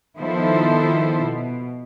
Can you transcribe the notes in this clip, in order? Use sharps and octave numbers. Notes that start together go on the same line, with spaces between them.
D#3 F3 B3 E4 A4 C5
B2